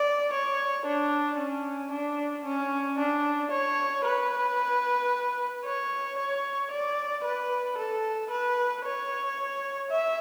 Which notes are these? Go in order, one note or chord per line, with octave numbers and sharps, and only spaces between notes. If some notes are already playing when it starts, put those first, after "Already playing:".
Already playing: D5
C#5
D4
C#4
D4
C#4
D4
C#5
B4
C#5
C#5
D5
B4
A4
B4
C#5
E5